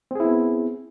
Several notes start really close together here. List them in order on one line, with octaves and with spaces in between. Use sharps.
C4 G#4 E4 B3